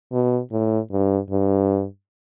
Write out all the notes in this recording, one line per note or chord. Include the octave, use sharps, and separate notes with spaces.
B2
A2
G2
G2